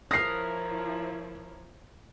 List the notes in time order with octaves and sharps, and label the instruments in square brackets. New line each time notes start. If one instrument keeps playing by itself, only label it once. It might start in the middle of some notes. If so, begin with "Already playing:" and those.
[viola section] F3 E4 C#5 [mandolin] A#4 B4 D#6 [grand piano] A#6 C7